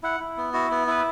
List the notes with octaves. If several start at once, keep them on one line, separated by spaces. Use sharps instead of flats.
E4 F#5
E4
B3
E4 F#4
B3
E4 B4